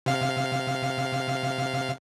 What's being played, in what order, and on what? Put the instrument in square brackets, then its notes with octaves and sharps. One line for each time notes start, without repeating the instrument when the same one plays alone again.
[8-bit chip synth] C3 F5